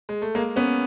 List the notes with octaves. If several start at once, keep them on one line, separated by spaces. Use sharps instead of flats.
G#3
A3
G#3 A#3
B3 C#4